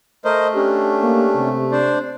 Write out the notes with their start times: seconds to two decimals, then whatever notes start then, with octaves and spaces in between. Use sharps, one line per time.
0.25 A3 A#4 C5 D#5
0.55 C#4 D4 G4
1.03 A#3
1.35 C3
1.72 D4 C5 D5